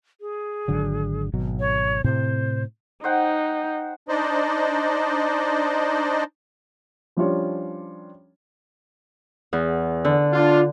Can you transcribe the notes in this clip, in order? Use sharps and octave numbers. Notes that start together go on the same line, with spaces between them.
G#4
G#1 D3 F#3
G#1 B2 F#3
C#5
A2 C3 C4 C5
D#4 C5 F#5 G5
D4 D#4 C5 D5 D#5
F3 G3 C#4 D4 F4 C#5
E2
D3
D4 F4